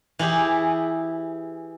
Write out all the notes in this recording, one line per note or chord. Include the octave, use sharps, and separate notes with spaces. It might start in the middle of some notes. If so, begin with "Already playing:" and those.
E3 E4 G4 G#4